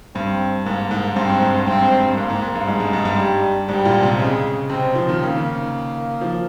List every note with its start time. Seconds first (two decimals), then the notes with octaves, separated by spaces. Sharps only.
0.15 G2 C4
0.66 G#2 A#3
0.91 G#2
1.16 G2 C4
1.29 G#2
1.42 G#2
1.54 G2
1.67 G2 C4
1.84 G#2
2.00 G2
2.17 G#2 A#3
2.30 G#2
2.42 G#2
2.55 G2
2.67 G#2 G#3
2.80 G2
2.93 G#2
3.05 G2
3.18 G3
3.68 G#2 G3
3.85 A#2
4.02 C3
4.19 C#3 G#3
4.70 C3 C4
4.95 F3
5.09 D#3
5.20 C#3 A#3
5.37 D#3
6.21 F3